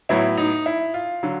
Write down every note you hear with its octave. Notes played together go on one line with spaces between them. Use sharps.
A2 F#3 B3 E4
D#4
E4
F4
D3 F#3